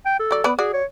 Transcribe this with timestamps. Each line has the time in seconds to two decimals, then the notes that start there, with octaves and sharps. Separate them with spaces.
0.06 G5
0.19 A4
0.31 F#3 D5
0.44 B3 B4 D5
0.59 F#4 G#4 D5
0.73 C#5